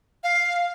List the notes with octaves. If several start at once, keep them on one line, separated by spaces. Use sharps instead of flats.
F5